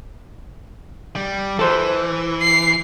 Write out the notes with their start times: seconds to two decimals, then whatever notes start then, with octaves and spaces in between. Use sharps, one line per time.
1.16 G3
1.59 E3 A4 C5
2.42 C7